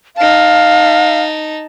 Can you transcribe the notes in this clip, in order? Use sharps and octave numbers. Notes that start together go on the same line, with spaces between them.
D#4 F5 A5